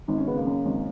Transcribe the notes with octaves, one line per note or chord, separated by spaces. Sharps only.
G#1 D#4
C#4
C#3 B3
A#3
F#2
G#1